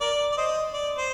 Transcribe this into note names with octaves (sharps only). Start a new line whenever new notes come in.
A#4 D5
D5
C5 D#5
D5
C5